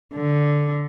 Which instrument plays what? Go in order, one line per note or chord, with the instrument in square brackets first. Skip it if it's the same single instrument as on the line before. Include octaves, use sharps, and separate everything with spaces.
[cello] D3